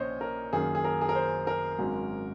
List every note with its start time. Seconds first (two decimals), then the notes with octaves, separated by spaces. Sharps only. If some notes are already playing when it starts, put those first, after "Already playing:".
Already playing: A#1 A#2 C#4 C5 C#5 D#5
0.21 A#4
0.53 F#2 D#3 A#3 C#4 G#4
0.75 G#4
0.85 A#4
1.01 G#4
1.09 A#4
1.15 C5
1.47 A#4
1.79 G#1 G#2 F#3 C#4